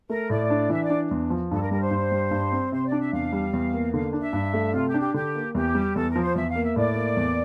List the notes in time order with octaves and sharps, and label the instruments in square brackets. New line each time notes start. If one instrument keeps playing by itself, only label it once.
[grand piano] A3 [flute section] A#4
[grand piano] A2 [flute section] D5
[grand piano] D4
[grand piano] E3 [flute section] E5
[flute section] D5
[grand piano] D4
E2
F3
[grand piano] G2 [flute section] A4
[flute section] A#4
[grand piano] G3 [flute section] A#4
[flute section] C5
[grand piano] G2
G3
G2
C4
[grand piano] C3 [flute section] C5
[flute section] D5
[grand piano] D4
[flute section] E5
[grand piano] E2 [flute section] F5
[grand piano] G3
E2
A#3
[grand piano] D3 [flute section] F5
[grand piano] D4
[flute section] E5
[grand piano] G2
A3
[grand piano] C3 [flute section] F4
[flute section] G4
[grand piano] D4
[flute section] G4
[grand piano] D3 [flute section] G4
[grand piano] A#3
[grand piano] E2 [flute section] G4
[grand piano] G3
[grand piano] E2 [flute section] A4
[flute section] A#4
[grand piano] F3
[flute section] C5
[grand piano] E2 [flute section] E5
[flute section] F5
[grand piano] A#3
[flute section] E5
[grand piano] A2 [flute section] D5
[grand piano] A#3
E2